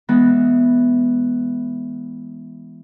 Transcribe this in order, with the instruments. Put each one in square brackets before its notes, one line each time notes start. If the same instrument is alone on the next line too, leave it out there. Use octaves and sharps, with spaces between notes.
[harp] E3 G#3 B3